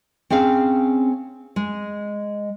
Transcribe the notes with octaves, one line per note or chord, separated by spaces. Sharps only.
C4 C#4 G#4 F5
G#3